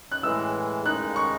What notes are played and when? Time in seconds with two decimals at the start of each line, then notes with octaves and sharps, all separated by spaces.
0.12 F#6
0.23 A2 E3 G#3 E6
0.85 D#3 G#3 D#4 F#6
1.16 C#6